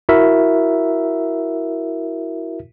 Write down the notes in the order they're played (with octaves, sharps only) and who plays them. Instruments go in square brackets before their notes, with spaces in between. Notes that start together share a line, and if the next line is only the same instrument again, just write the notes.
[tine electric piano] E4 F#4 A#4 E5